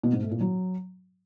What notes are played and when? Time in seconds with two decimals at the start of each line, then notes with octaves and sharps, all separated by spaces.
0.03 B2
0.13 G#2
0.22 A3
0.31 A#2
0.41 F#3